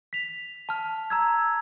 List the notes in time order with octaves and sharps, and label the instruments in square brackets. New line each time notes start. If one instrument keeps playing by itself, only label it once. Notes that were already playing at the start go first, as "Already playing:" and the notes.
[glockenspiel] B6 F7
A5 F6
A#5 E6 G#6